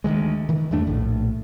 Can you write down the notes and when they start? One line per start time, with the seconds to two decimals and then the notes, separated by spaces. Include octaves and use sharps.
0.04 D2 D#3 E3 G#3
0.49 D#3 E3
0.71 E2 G2 A3 D4
0.87 A#1 A2